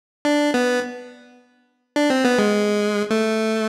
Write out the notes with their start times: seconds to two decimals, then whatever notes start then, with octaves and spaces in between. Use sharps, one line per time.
0.25 D4
0.54 B3
1.96 D4
2.10 C4
2.25 B3
2.39 G#3
3.11 A3